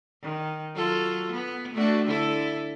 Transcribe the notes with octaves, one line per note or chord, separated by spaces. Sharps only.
D#3
F#3 F4 A4
B3
A3 D4 F#4
D3 E4 A4